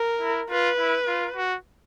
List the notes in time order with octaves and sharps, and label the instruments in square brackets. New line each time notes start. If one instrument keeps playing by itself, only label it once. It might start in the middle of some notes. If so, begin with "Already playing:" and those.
Already playing: [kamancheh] A#4
[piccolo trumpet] E4
[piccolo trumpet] F4 [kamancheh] B4
[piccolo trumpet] E4
F4
F#4